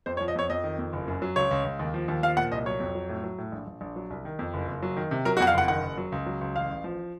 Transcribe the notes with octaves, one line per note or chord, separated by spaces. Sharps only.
F2 C5
C#5
F3
D#5
F2 C#5
F2 D#5
D#3
F2
F#1
F#2
F#3
C#2 C#5
C#2
C#2
D#2
F3
D#2
F3 F5
A#2 F#5
C2 D#5
F#3 C#5
F2
F#3
A2
F#3
A2
A#1
A#1
A#1
F#3
C2
D#3
F2
F#1
F#1
F#3
D#3
C3
F#3 A#4
F#4
F2 F#5
F5
F#1 F#5
D#3 F#5
F#1
F#3
C#2
F#3
C#2
A1 F5
A1
F3